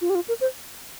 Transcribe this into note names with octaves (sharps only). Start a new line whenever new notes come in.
F4
G4
F4
A#4
C5